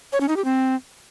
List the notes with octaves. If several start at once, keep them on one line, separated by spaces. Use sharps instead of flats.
C#5
C#4
D#4
G4
C4